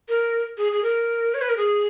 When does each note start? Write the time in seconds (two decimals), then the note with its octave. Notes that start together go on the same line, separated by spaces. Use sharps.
0.09 A#4
0.58 G#4
0.72 G#4
0.83 A#4
1.34 C#5
1.41 B4
1.49 A#4
1.57 G#4